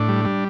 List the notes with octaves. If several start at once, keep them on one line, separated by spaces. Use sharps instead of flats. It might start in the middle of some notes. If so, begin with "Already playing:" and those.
Already playing: A2 D4
G3
G3